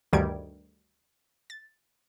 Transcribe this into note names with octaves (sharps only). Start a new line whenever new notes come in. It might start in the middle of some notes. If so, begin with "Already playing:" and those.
D2 G2 D#3 G3 G#6 D7
A6